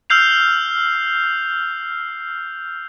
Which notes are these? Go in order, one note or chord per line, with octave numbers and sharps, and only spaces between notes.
E6 F6 G6 C7 F7